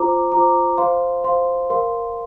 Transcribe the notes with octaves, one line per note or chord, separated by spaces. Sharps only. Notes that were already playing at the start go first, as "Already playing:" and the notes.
Already playing: F4 C5 A#5 D6
F4 C5 A#5 D6
C5 F5 C6
C5 F5 C6
A#4 F5 C6